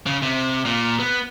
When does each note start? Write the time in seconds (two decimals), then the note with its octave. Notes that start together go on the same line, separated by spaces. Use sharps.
0.06 C#3
0.23 C3
0.65 A#2
1.00 B3